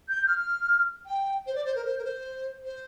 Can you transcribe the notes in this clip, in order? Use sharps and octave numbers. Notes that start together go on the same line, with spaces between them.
G6
F6
G5
C5
D5
C5
A#4
C5
A#4
C5
C5